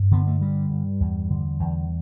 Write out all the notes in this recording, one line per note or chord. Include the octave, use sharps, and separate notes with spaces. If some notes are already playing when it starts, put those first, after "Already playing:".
Already playing: G2
D3 B3
A3
G2 G3
G2
E2
D3
E2